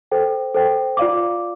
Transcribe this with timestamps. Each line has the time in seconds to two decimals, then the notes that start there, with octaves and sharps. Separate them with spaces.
0.12 A4 C5 G5
0.54 A4 C5 G5
0.97 F4 D5 F5 D6